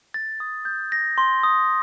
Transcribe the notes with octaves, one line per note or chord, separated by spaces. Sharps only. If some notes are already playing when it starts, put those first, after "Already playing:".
A6
D#6
G6
A#6
C6
D#6